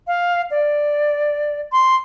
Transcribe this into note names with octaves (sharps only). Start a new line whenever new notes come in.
F5
D5
C6